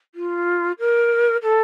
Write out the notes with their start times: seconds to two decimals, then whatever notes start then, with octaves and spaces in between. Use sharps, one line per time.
0.15 F4
0.79 A#4
1.42 A4